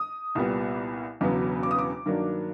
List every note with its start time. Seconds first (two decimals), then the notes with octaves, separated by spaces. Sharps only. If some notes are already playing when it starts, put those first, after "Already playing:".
Already playing: D#6
0.35 C2 A#2 G3 B3
1.21 E1 E2 C#3 F#3 B3
1.63 D6
1.71 D#6
1.79 D6
2.05 G2 D#3 F#3 A#3 D4